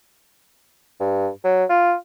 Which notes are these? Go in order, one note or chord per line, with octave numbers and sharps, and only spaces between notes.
G2
F#3
F4